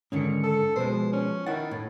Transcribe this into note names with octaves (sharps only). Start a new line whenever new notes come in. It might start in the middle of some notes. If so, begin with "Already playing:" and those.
G#2 D3 D#3 C#4 C#7
A4
B2 F3 G#3 B4 C5
C#4
D#3 E4 F#5 A6
A2